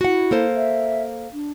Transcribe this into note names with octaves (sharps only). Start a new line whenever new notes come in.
E4 F#4 F#5
A#3 A4 C5
E5
D4